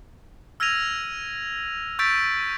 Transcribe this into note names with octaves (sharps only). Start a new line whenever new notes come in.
E6 F6 G#6 A#6 D#7 F7
C#6 E6 G6 A6 B6 D7